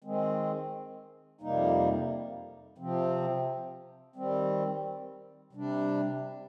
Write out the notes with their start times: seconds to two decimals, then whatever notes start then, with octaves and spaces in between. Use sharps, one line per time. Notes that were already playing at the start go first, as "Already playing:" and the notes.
0.04 D#3 G#3 C4
1.41 F2 C3 G3 A#3 D#4
2.78 C3 F3 C4
4.16 D#3 G3 C4
5.53 C3 G3 D4